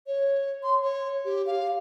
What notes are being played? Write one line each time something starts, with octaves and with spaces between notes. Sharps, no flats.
C#5
C6
C#5
G4
F5